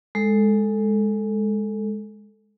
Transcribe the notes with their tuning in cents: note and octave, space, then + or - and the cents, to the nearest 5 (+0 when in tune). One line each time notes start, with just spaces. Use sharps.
G#3 +0 A4 +0